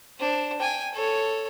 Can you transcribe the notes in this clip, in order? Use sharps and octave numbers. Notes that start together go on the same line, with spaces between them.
D4 C5
G5 G#5
A4 C#5